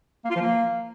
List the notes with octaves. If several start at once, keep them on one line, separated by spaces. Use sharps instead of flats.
A#3
F4
F3
A#3